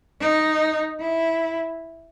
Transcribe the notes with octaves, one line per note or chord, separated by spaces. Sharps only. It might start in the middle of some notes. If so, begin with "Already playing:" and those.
D#4
E4